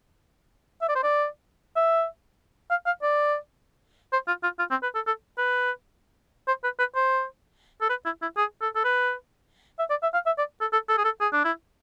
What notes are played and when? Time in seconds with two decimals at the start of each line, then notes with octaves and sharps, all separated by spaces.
0.82 E5
0.88 D5
0.95 C5
1.03 D5
1.76 E5
2.70 F5
2.86 F5
3.02 D5
4.13 C5
4.28 F4
4.43 F4
4.59 F4
4.71 C4
4.83 B4
4.95 A4
5.07 A4
5.38 B4
6.48 C5
6.64 B4
6.79 B4
6.95 C5
7.81 A4
7.89 B4
8.05 E4
8.22 E4
8.37 G#4
8.61 A4
8.75 A4
8.84 B4
9.79 E5
9.90 D5
10.02 E5
10.14 F5
10.26 E5
10.38 D5
10.61 A4
10.73 A4
10.89 A4
10.97 G#4
11.04 A4
11.20 G#4
11.32 D4
11.44 E4